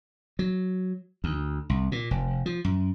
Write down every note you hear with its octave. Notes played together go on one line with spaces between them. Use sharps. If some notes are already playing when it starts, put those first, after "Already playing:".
F#3
D2
C2
A#2
F1
F3
F#2